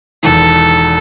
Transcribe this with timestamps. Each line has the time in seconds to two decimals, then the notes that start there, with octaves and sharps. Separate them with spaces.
0.23 E1 E2 D#3 A4